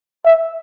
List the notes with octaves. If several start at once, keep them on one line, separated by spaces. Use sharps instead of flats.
E5